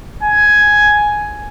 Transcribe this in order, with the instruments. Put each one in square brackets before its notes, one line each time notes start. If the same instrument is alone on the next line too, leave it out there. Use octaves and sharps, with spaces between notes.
[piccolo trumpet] G#5